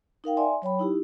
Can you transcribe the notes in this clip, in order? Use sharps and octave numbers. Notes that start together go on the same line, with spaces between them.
D#4 A#4 F5 G5
D5 E5 G#5 C6
F#3 C#5 G5 B5
D#4 E4 G4